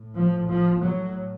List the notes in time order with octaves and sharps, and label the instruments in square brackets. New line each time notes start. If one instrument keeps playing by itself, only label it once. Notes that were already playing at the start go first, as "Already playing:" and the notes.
Already playing: [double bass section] A2
F3
F3
F#3